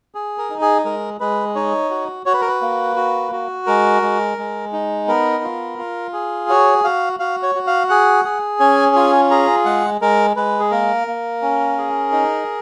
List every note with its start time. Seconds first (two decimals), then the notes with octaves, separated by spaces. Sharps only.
0.15 G#4
0.38 A#4
0.50 D#4
0.61 G#4
0.85 G#3 A#4
1.20 G#3 B4
1.55 D#4 C#5
1.90 F#4
2.26 F#4 C#5
2.34 B4
2.41 A#4
2.48 B4
2.61 A#3
2.96 F#4
3.32 F#4
3.66 G#3 A#4
4.02 G#3
4.38 G#3
4.72 D#4
5.08 B3 A#4
5.44 F4
5.78 F4
6.13 G#4
6.49 F#4 C#5
6.84 F#4 F5
7.19 F#4 F5
7.43 C#5
7.55 F#4
7.67 F5
7.89 G#4 F#5
8.25 G#4
8.60 C#4 G#5
8.96 F4 G#5
9.31 G#4 A#5
9.65 G#3 F#5
10.01 G#3 A#4
10.36 G#3 B4
10.60 G#4
10.71 A#3 A#4
11.07 A#3
11.42 C#4
11.78 G#4
12.12 D#4